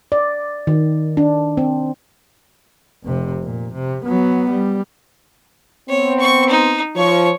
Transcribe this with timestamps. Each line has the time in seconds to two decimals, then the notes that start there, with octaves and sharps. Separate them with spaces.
0.12 D5
0.67 D#3
1.17 D4
1.57 C4
3.04 F1 C3
3.43 A#2
3.74 C3
4.05 F#3 B3
4.50 G3
5.89 B3 C4 C#5
6.20 C#6
6.49 D#4
6.96 F3 C#5 C#6